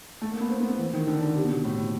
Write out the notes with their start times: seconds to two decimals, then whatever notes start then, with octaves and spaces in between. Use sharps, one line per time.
0.21 A3
0.31 A#3
0.41 B3
0.50 C4
0.60 B3
0.69 A#3
0.79 E3
0.93 D#3
1.07 D3
1.21 D3
1.36 C3
1.45 B2
1.64 A2